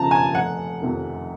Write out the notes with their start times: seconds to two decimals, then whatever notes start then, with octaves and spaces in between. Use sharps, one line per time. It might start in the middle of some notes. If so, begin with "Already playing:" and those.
Already playing: D#2 C#3 F3 A5 A#5
0.11 G#5
0.33 F1 F#5
0.81 F2 C3 D#3